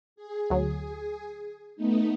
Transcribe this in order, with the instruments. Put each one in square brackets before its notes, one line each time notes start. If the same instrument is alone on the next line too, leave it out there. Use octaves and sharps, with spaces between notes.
[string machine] G#4
[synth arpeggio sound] D2 F#3
[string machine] A3 B3 D#4